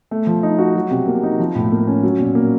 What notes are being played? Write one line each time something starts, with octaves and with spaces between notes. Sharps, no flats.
A3
F3
D#4
F#4
F#3
C3
A#3
D#4
F3
A2
A#3
C#4
F#3
A#2
A#3